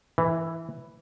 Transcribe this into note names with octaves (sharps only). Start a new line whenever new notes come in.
E3